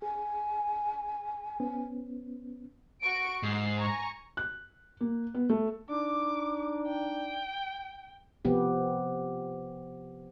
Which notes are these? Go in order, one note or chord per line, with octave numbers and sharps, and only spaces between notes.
G#4 G#5
B3 C#4
F#4 C#6 D7
G#2 C7
G#5 A#5 C#6
F#6
A#3
B3
A3
D4 D#4 D6
G5
C3 F3 B3 G4